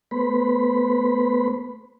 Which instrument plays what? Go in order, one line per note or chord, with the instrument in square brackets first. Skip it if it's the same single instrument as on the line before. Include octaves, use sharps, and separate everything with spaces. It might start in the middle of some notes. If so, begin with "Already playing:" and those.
[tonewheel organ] A3 B3 B4 C5 B5